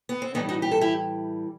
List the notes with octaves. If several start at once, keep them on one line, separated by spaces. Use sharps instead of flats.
B3
C4
A2 E3 G3 B3 D#4
D#4 F#4
G4
A4
E4 G4